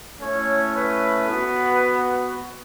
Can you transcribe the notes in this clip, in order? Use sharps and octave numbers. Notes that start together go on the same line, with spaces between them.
A3 C#4 E4 C#5
B4
B3 F#4